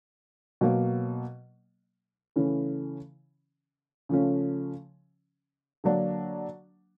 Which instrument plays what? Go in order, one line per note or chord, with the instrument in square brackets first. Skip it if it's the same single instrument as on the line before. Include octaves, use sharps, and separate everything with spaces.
[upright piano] B2 F#3 A#3
C#3 E3 A3 C#4
C#3 F3 A3 C#4
D3 F#3 A#3 D4